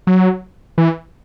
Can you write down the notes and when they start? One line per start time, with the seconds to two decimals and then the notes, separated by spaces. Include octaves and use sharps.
0.07 F#3
0.78 E3